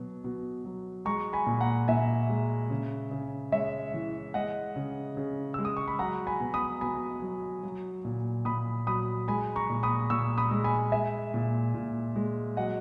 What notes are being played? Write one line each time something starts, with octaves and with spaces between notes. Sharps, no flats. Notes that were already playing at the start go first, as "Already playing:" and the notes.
Already playing: B2 F#3
B2
F#3
G#3 A#5 C#6
G#5 B5
A#2
F#5 A#5
A#2 E5 G#5
G#3
C#3
C#3
G#3 C#5 E5
E3
G#3 D#5 F#5
C#3
C#3
G#3 E6
D#6
C#6
B5
F#3 F#5 A#5
G#5 B5
B2
B5 D#6
B2 G#5 B5
F#3
F#3
A#2
A#2 B5 D#6
F#3 B5 D#6
G#3 G#5 B5
A#5 C#6
A#2
B5 D#6
A#2 C#6 E6
B5 D#6
G#3
G#5 B5
G#3 E5 G#5
A#2
A#2
G#3
F#3 D#5 F#5